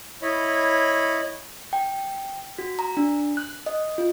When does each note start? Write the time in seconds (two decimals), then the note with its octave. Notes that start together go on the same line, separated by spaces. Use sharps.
0.22 E4 C#5 D#5 B5
1.73 G5
2.59 F#4
2.79 A#5
2.97 D4
3.37 F#6
3.66 D#5
3.98 F4